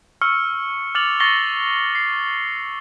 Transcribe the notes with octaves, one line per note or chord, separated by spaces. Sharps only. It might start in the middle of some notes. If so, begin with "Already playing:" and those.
C#6 E6 F6 C#7
D6 F6 A6 C#7 F7 F#7
C#6 A6 A#6 C7 C#7 G7
C7